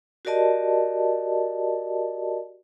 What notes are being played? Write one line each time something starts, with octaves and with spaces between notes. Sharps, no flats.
F#4 G4 A#4 D5 D#5 A5